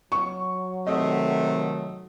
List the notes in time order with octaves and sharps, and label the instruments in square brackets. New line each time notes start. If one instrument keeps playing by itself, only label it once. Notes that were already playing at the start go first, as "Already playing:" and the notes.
[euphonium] F#3 [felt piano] C#6
[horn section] C3 D#3 A3 [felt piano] D#5